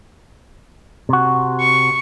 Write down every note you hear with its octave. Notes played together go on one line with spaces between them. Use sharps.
C3 F#4
C#6